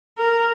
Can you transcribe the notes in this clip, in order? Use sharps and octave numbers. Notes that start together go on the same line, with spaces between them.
A#4